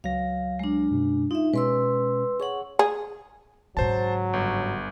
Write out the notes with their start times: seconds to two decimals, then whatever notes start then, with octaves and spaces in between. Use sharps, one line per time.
0.04 C#2 F#3 F5 A#6
0.59 G#3 D4
0.91 F#2 B2
1.31 D#4 F4 E5
1.54 B2 G#3 C#4 B4 C6 E6
2.40 G#4 C#5 F#5 C#6
2.79 G#4
3.77 G#2 C#3 F#3 C5 A5
4.33 G1